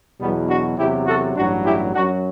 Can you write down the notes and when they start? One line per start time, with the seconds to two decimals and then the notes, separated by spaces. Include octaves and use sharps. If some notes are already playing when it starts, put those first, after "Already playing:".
0.20 E2 B2 F#3 G3 B3
0.49 D4 F#4
0.78 E2 C3 F#3 E4 G4
1.06 F#4 A4
1.36 A1 G2 F#3 D4 F#4
1.65 E4 G4
1.94 F#2 F#3 D4 F#4